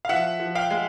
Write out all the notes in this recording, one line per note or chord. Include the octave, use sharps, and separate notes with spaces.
F5
F3 E5 F#5
F3
F5 G5
G#3